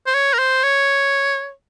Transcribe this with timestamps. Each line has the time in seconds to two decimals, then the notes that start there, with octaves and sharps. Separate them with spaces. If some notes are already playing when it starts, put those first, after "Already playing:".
0.07 C5
0.14 C#5
0.34 A#4
0.39 C5
0.64 C#5